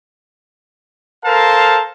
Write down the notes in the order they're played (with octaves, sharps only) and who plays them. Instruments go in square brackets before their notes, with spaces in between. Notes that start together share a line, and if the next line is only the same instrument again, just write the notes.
[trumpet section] A4 A#4 C5 F5 A5